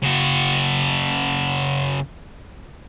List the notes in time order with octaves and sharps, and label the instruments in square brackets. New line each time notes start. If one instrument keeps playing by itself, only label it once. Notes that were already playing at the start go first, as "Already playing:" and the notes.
[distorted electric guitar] C#3 F#4